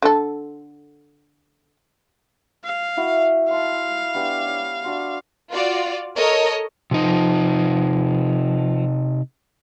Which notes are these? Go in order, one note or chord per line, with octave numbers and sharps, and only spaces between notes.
D3 A4
F5
E4 F#4
F5 A5 C6
B3 D4 G4
C#5
D4 F#4 C6
F4 F#4 D5
A4 A#4 C#5 D#5
C3 F3 D#4